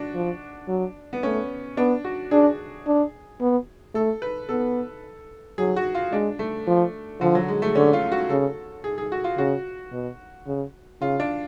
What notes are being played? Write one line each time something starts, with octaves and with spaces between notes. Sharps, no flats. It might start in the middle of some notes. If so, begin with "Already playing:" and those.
Already playing: D4 F#4
F3
F#3
B3
A3 C#4
B3 D4
F#4
D4 G#4
D4
B3
A3 A4
B4
B3 A4
F#3 G#4
F#4
F4
G#3 D4
A3
F3
D3 F3
F#3
G#3
A3
D3 C#4
F4
F#4
C#3 A4
G#4
G#4
F#4
F4
C#3 F#4
B2
C#3
C#3 F4
D4